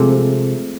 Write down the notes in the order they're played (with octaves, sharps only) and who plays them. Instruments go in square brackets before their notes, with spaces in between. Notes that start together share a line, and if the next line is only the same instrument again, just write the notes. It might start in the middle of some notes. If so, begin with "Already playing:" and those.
Already playing: [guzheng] C3 F3 G#3 A3